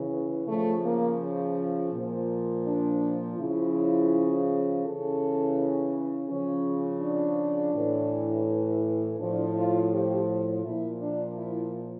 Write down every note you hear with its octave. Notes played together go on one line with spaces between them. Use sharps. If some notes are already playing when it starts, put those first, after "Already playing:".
Already playing: C#3 E3
C#3 F3 A3
A#3
A#2 F3
D4
C#3 F3 E4
C#3 E3 A4
C#3 F3 C#4
D4
A2 E3
A2 F3 D4
F4
G4
A#2 F3 E4
D4
E4